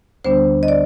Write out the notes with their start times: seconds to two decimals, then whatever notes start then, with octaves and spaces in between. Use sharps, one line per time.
0.24 D2 D3 G3 B3 D4 C5
0.63 D#5
0.68 D5